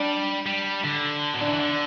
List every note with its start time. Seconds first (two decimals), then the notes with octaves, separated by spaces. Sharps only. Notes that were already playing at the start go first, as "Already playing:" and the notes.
Already playing: G3 D4 D5
0.46 G3
0.84 D3
1.34 F#3
1.41 D4 D5
1.47 E3
1.60 D3